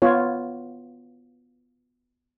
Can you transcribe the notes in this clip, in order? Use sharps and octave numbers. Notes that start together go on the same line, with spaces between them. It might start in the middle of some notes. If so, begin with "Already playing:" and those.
B3 F4 C#5